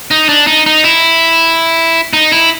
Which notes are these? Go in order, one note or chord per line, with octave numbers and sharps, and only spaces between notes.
D#4
D4
D#4
D#4
E4
D#4
E4